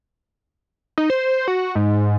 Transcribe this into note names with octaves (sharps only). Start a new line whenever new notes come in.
D#4
C5
F#4
G#2